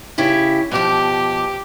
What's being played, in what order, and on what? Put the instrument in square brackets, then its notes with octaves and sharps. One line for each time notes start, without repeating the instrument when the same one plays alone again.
[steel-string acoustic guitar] C#3 E4 G4
[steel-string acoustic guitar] B2 F3 [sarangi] G4